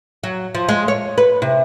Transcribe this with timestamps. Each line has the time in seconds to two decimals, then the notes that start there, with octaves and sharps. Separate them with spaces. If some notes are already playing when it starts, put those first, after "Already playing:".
0.24 F#3
0.55 F3
0.69 G#3
0.88 C#5
1.18 B4
1.42 C3